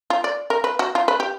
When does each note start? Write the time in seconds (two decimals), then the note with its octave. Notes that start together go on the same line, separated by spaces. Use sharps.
0.10 F4
0.24 D5
0.50 A#4
0.64 B4
0.79 F#4
0.95 F4
1.08 B4
1.20 G4